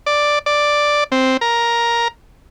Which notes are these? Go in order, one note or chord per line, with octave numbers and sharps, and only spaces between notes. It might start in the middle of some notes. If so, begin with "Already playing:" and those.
D5
D5
C4
A#4